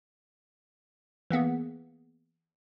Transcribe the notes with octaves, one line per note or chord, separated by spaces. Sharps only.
E3 A#3 B3 G#4